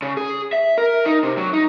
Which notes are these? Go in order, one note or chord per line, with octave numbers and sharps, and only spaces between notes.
C#3
G#4
E5
A#4
D#4
C3
F#3
D#4